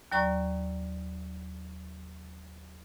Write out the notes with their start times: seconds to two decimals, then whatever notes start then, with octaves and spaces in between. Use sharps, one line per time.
0.12 D#2 F#3 D5 A#5 C#6